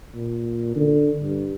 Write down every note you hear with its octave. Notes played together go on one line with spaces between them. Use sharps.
A#2
D3
G2